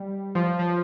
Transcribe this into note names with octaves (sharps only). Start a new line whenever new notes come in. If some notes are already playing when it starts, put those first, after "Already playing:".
Already playing: G3
F3
F3